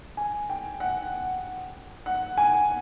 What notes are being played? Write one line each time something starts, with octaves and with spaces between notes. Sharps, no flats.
G#5
G5
F#5
F#5
G#5